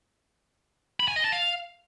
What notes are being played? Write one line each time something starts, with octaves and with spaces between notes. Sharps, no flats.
B5
G#5
D#5
A5
F5